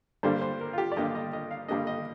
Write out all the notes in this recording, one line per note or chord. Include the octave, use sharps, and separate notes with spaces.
G2 D3 G3 A#3 D4 C5
C5
A#4
F4
G4
D5
G2 D3 G3 A#3 D4 D#5
D#5
D#5
F5
G2 D3 G3 A#3 D4 D#5
D#5